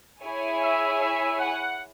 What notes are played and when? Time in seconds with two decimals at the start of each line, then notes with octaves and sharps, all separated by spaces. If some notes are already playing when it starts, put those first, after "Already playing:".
0.22 E4 G#4 C#5 G#5
0.61 E5
1.01 E5
1.38 F#5